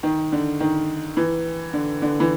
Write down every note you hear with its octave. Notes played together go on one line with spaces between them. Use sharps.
D#3
D3
D#3
E3
D3
D3
E3